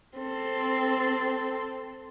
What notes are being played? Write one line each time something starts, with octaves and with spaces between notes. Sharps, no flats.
C4 A4